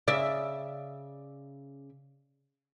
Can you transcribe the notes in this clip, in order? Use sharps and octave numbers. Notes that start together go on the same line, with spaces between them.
C#3 D5 E5